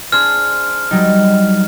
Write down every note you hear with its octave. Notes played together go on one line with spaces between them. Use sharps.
D4 G#4 C5 F6
F#3 G3 D#4